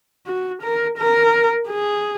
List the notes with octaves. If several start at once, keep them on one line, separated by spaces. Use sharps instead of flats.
F#4
A#4
A#4
G#4